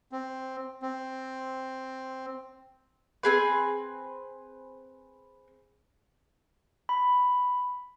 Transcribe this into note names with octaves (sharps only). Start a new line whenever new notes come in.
C4
C4
C4 G#4 B4
B5